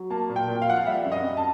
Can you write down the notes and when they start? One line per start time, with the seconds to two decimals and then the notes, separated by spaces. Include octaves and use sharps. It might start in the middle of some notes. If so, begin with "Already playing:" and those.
Already playing: F#3
0.10 A#3 A5
0.30 A#2
0.36 G5
0.48 A#2
0.62 F5
0.68 F3 F#5
0.76 F5
0.87 G3 E5
1.05 F#2
1.12 D#5
1.24 F#2
1.37 A5